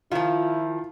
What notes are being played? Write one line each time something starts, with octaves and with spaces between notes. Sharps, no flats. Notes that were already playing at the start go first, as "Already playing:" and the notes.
D#3 F3 E4 F4